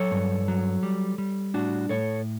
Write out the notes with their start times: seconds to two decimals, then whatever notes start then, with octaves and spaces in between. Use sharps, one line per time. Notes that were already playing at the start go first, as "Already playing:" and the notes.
Already playing: F#3 A4 C#5
0.11 G2
0.48 F#3
0.83 G3
1.18 G3
1.54 A2 D4 F#4
1.89 A2 A4 C#5